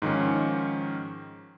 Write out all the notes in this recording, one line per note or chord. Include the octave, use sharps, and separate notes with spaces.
G#2 D#3 F3 C#4